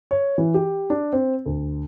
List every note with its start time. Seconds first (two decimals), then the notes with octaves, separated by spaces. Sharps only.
0.11 C#5
0.38 E3
0.54 G4
0.90 D4
1.13 C4
1.46 D2